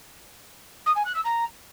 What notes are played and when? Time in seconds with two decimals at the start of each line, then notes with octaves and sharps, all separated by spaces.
0.86 D#6
0.96 G#5
1.05 F#6
1.15 E6
1.25 A#5